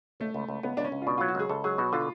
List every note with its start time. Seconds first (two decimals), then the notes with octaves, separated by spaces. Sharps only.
0.20 C#2 A3
0.34 C#2
0.48 C#2
0.63 C#2 B3
0.77 C#2 D4
0.85 C#4
0.92 C#2
1.02 F4
1.06 B2 D4
1.18 F#3 F4
1.28 F#4
1.35 C#2 G#4
1.49 C#2 A4
1.64 F#3 G#4
1.78 B2 F#4
1.93 D3 F4